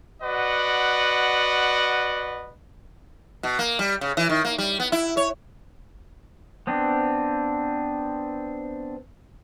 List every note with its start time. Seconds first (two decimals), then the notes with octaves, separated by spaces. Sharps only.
0.23 F#4 B4 D5 D#5 F#5
3.43 B2
3.59 A#3
3.79 G3
4.01 C#3
4.17 E3
4.29 D#3
4.45 A#3
4.58 G3
4.80 B3
4.92 E4
5.17 C#5
6.67 B3 C4 D4